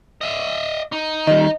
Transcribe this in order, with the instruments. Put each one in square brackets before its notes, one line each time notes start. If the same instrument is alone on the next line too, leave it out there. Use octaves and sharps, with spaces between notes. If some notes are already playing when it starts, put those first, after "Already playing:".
[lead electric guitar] D#5 E5
D#4
[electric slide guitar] D#3 G3 [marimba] D#5